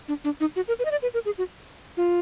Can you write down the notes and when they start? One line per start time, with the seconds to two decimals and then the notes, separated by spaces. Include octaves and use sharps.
0.08 D4
0.24 D4
0.40 D#4
0.56 F#4
0.68 A#4
0.79 B4
0.85 D#5
0.91 D5
1.02 B4
1.14 A#4
1.26 G#4
1.38 F#4
1.97 F4